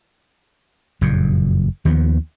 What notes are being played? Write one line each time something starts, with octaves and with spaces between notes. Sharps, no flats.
F#1 F2 A#2
D#2 D#3 F3 B3